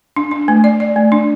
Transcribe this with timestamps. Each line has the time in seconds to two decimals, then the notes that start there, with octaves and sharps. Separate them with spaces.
0.16 D4
0.31 D4
0.48 A3
0.64 D5
0.80 D5
0.96 A3
1.12 D4